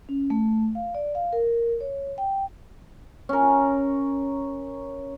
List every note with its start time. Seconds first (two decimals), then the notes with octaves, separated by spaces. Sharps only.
0.09 C#4
0.30 A3
0.75 F5
0.95 D5
1.15 F5
1.33 A#4
1.81 C#5
2.18 G5
3.29 C#4 A#4